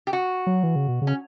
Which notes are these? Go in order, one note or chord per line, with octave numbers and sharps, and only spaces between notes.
G4
F#4
F#3
E3
C#3
B2
C#3
C#4